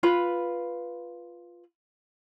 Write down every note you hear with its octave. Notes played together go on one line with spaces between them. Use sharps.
F4 B4 B5